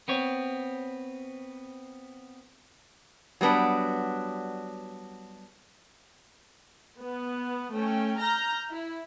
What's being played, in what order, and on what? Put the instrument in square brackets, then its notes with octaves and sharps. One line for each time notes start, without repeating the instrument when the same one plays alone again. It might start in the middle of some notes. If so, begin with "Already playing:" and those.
[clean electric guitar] B3 C4 C#5
[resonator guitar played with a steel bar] F#3 G3 B3 D4
[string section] B3
A3 C#4 G5
A#5 F6 G6 A#6
E4